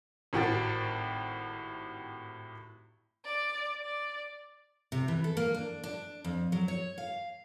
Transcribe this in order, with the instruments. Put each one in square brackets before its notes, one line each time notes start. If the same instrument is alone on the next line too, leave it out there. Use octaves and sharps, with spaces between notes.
[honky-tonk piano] G#1 A2 F#4 G4 G5 A6
[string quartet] D5
D5
[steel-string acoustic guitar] C3
E3
A4
A#3
D4
D4
F2
F#3
C#5
F5